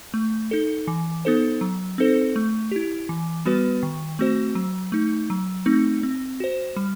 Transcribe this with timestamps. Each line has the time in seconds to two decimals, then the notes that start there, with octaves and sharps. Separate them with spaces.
0.14 A3
0.51 D#4 A4
0.87 E3
1.25 B3 D#4 A4 C5
1.61 F#3
1.98 C4 D#4 A4 C5
2.36 A3
2.71 E4 G4
3.09 E3
3.46 G3 B3 F#4 B4
3.83 D#3
4.19 A3 C4 F#4 C5
4.55 F#3
4.92 A3 D#4
5.30 F#3
5.66 A3 C4 D#4
6.03 C4
6.40 F#4 C5
6.76 G3